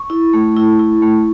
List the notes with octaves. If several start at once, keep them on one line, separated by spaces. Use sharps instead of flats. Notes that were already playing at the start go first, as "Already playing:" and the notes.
Already playing: C#6
E4
A3
E4
E4
A3